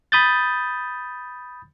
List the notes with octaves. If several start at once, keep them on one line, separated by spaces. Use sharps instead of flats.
B5 D#6 G6 A6